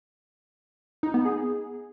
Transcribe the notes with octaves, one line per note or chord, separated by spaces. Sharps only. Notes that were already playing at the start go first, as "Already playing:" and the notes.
D#4
B3
G#4